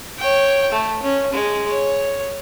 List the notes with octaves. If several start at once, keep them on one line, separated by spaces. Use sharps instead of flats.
C#5 G5
A3
C#4
G#3
C#5